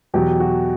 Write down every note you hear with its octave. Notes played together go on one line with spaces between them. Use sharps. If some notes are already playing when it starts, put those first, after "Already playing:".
E2 B2 F#3 G4
F#4